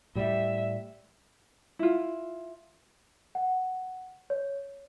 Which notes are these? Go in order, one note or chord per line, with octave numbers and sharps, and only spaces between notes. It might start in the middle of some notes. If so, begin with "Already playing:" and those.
A2 G3 E5
E4 F4
F#5
C#5